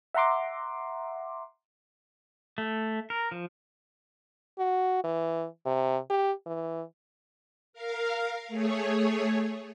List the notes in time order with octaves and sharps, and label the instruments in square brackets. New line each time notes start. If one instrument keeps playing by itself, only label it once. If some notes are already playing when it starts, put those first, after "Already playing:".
[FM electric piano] E5 F#5 A#5 C6 D6
[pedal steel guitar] A3
A#4
F3
[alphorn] F#4
E3
C3
G4
E3
[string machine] A#4 F5
A3 G#4 C#5